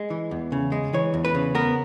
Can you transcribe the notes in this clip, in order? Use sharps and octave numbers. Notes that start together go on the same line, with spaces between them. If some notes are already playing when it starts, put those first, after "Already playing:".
Already playing: G#3
E3
E2
C#3
G#3
E3 C#5
E2
B4
C#3
B3 A#4